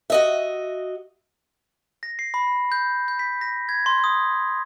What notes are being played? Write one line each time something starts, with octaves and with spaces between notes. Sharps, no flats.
F#4 D#5 E5
A#6
C7
B5
G6
G6
B6
A#6
G#6
C6
D#6